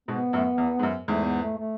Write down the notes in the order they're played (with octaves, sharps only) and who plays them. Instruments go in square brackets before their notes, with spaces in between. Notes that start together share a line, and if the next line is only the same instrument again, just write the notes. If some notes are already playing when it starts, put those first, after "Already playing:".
[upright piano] G#2 B2 [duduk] B3
[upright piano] F#2 A2
E2
G#2
F#2
[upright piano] E2 G#2 [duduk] A3
[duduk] B3
A3
A3